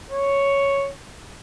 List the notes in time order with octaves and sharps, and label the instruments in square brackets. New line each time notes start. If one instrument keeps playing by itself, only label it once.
[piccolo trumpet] C#5